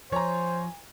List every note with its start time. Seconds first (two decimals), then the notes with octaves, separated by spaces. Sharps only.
0.12 F3 C5 C#5 G#5 A#5